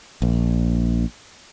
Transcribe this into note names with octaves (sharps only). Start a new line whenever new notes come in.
A#1